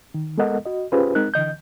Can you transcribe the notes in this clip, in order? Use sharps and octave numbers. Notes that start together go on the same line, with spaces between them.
D#3
G#3 B3 A4 A#4 D#5 F#5
F#4 D#5
C#4 F4 G4 G#4 B4 C5
G#3 C4 D#4 A#4 F#6
D3 E3 D#5 G6